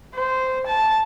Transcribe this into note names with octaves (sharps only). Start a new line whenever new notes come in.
C5
A5